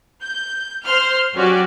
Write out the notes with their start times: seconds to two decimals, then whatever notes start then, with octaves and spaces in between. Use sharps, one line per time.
0.23 G6
0.85 C5 C6 F6
1.34 F#3 C#4 F#4 G4 D5